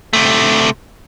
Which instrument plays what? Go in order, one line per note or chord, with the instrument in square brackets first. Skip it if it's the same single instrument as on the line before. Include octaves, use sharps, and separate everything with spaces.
[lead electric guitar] C3 A3